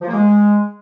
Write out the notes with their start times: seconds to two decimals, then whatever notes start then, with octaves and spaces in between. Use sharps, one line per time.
0.02 F3
0.07 A#3
0.13 G#3